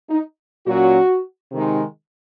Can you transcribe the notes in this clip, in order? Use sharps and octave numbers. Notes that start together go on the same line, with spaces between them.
D#4
A#2 F#3 C#4 F#4
C3 D#3 G#3 D#4